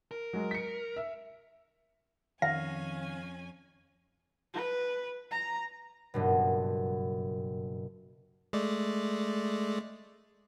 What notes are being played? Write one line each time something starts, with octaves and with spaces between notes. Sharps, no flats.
A#4
F#3 G#3
B6 C#7
E5
F2 D#3 C#4 F5 G#5 A#6
B4
A#5
F#1 G2 B2
G#3 A3 D5